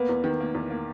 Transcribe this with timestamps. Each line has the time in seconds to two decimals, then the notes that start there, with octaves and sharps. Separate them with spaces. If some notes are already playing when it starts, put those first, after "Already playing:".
Already playing: A#3 B3
0.09 E2
0.24 D#3
0.40 A#3
0.55 E2
0.70 A#3